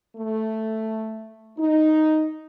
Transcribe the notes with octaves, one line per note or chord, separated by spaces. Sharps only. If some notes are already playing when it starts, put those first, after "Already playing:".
A3
D#4